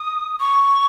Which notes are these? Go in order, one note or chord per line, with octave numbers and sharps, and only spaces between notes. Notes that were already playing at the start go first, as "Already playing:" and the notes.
Already playing: D#6
C#6